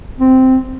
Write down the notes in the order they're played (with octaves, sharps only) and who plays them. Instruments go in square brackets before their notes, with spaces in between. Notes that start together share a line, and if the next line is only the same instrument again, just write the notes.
[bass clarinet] C4